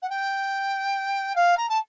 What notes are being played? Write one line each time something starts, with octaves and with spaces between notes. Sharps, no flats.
F#5
G5
F5
A#5
A5